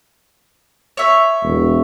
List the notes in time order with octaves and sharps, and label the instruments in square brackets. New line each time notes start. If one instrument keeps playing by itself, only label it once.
[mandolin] C#5 E5
[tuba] E1